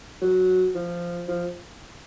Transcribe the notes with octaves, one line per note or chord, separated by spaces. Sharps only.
F#3
F3
F3